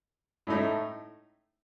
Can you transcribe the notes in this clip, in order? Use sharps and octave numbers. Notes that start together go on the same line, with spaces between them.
A2 A3 D#4